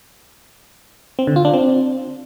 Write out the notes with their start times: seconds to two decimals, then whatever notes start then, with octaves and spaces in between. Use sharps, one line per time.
1.19 C4
1.27 D3
1.36 F4
1.45 D4
1.54 C4